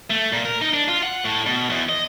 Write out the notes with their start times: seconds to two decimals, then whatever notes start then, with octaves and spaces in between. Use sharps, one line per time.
0.10 A3
0.32 A#2
0.45 A#4
0.62 D#4
0.74 D4
0.88 F4
1.03 F#5
1.25 A2
1.46 B2
1.70 E2
1.89 D#5